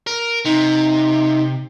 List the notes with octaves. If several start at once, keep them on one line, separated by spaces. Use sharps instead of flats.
A#4
C3 D#4